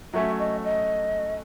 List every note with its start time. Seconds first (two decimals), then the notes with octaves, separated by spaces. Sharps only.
0.13 F#3 A3 C#4 E5
0.39 D#5
0.64 D#5